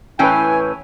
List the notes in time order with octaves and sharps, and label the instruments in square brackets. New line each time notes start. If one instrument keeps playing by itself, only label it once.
[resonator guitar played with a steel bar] A2 E3 C#4 [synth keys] B4 C#5 G5 [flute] G#5